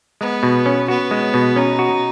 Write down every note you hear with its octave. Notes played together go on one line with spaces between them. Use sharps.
G#3 B3
B2
C#4
B3 F#4
G#3
B2
C#4 D#4
F#4